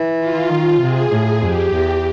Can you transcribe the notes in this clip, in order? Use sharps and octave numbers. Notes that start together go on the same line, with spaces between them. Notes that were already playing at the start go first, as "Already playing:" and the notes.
Already playing: E3
F4
D#3
C3 G#4
A2
F2 G4
E2